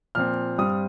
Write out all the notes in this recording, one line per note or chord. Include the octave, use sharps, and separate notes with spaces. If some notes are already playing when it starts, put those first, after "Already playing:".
A#2 F3 C4 F6
G2 G3 C4 D#6